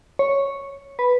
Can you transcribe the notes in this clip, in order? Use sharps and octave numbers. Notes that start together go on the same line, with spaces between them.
C#5
B4